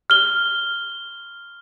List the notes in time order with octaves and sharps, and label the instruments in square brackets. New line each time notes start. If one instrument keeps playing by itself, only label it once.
[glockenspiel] F6 G7